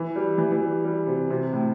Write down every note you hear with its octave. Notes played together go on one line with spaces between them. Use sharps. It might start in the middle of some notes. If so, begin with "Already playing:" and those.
Already playing: E3
G3
E3
E3
G3
G3
C3
C3
A2